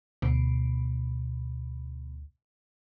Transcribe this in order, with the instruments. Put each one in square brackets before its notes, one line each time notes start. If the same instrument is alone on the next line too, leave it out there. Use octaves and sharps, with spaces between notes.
[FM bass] D2 [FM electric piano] B2